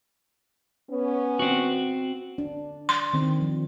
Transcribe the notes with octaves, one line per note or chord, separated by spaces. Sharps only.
B3 C#4
C4 F#4
D4
C6
D#3 C4
F3